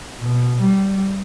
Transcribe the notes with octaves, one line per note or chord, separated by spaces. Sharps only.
B2
G3